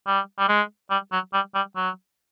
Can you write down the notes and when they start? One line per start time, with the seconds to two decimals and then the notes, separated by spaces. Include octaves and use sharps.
0.07 G3
0.39 G3
0.49 G#3
0.91 G3
1.12 F#3
1.33 G3
1.55 G3
1.76 F#3